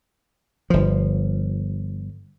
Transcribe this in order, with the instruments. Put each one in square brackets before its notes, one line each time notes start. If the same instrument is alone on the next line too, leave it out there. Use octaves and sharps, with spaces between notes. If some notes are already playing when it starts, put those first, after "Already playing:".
[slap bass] G1 F3